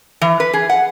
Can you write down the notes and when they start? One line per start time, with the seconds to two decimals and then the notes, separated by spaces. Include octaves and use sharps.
0.21 E3
0.40 B4
0.53 G#4
0.69 F#5